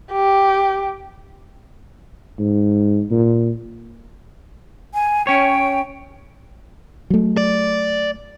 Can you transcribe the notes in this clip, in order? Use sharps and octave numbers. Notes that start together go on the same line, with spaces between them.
G4
G#2
A#2
G#5
C#4 C#5 G5
F#3 A3
D5